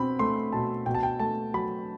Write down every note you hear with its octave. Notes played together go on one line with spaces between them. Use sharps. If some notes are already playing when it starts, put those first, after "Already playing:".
Already playing: B2 C4 B5
A3 C6
B2 A5
B2 G5
A5
G5
A3 A5
F#3 B5